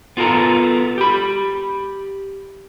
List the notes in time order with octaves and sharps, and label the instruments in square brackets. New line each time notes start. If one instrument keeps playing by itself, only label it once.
[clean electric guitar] B3 F4 A4 A#4 A#5
G4 B5